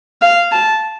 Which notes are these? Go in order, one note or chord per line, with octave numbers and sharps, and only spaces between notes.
F5
A5